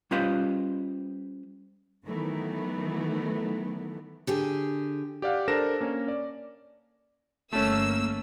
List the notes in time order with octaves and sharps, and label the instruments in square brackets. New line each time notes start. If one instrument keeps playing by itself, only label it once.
[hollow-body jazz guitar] G3 C#4 F4 B4 C5 D#5
[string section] D#3 E3 F#3 A3 B3
[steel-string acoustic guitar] D3 G4 G#4
[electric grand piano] G4 D5 F5 F#5
D4 A4 A#4 C5 A#6 E7
A#3 C#4
D5
[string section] G1 A#3 E6 [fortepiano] A3 C#4